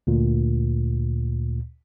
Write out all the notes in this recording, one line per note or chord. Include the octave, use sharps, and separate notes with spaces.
D2 A#2